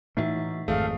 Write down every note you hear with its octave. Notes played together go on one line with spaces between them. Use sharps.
A2 E3 A3 D#4 F#4 E5
G#1 F2 A3 G#4 F5